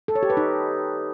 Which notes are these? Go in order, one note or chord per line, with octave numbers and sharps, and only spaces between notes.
A4
C#5
G4
B4
D#4